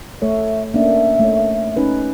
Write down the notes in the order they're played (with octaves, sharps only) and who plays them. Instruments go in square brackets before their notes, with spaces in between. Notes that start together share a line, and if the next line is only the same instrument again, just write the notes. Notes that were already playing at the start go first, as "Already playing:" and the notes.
[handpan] A3 A4 C#5 [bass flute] E5
[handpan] A#3 C#4 D4 [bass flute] E5
[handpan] A3 C#5
C#4 D#4 B4